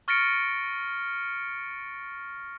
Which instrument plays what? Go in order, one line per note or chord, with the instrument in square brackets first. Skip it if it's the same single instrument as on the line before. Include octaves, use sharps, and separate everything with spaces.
[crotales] C#6 F6 A6 A#6 C#7 D7